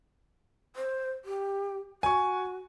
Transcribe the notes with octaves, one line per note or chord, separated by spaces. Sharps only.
C5
G4
F#4 G#5 C#6